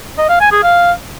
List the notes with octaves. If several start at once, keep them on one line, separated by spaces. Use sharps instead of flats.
D#5
F5
G#5
G#4
F5